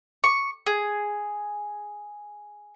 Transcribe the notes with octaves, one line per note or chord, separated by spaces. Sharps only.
C#6
G#4